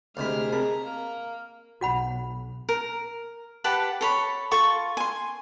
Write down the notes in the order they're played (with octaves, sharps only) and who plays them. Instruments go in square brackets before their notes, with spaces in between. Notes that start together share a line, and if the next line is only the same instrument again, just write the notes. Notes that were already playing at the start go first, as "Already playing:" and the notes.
[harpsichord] D2 C3 B5 [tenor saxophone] G#3 [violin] A#4 F6
[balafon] C4 G#4 A#4 [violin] A#5 [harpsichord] B5
[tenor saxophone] A#3
[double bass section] B1 [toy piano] F#4 F#5 B5
[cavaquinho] A#4
G4 B4 F#5 A5
A4 C#5 B5
F4 A4 C#6
G#5 C6